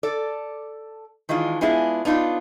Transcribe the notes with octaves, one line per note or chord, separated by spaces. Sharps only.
A4 D5
D#3 E3 G#3 D4 F4
G#3 B3 D4 E4 F4 G#4
B3 D4 D#4 F4